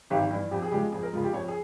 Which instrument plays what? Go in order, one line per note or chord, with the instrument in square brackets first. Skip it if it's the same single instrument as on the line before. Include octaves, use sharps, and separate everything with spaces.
[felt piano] G#1 G4
G2 E3
F2 G4
G#4
C#3 F3 G#3 G4
F2 G#4
A#4
C#3 F3 G#3 F4
G4
F2 C#5
G#4